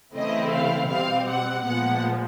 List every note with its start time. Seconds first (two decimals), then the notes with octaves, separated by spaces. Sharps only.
0.16 C#3 E3 A3 C4 E4 D#5
0.53 F5
0.90 B2 G3 C4 F5
1.28 F#5
1.65 A#2 F3 G#3 B3 F#5